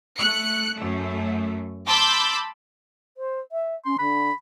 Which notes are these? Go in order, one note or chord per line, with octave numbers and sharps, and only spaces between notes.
A3 F#6 C#7
F#2 A3
A5 B5 C6 D6 E6 G6
C5
E5
C#4 C6
D3 B5